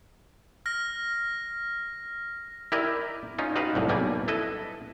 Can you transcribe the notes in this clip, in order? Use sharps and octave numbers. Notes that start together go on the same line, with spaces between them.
F6 A#6
E4 G4 A#4 D5 D#5
C#4 D#4 F4
D#4 F#4 G4 B4 F5
C2 A2 F#3
B1 B2 G3 A#3 D5 G#5
E4 A4 B4 D#5